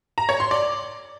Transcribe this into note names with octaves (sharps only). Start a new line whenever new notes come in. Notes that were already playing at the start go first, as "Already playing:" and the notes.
A#5
C#5
C6
D5